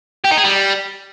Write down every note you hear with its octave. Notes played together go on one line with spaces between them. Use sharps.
G4
D#4
G#4
G3